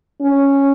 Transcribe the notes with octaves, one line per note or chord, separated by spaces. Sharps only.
C#4